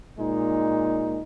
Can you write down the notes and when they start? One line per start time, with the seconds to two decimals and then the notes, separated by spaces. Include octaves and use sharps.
0.18 A#2 G#3 D#4